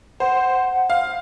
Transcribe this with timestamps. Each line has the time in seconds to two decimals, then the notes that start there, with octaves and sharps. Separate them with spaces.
0.20 C5 F#5
0.90 F5